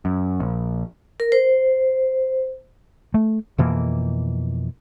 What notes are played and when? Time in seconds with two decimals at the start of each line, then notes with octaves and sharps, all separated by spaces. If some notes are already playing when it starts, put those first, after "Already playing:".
0.05 F#2
0.40 A#1
1.20 A#4
1.32 C5
3.14 A3
3.58 F2 B2 E3 A#3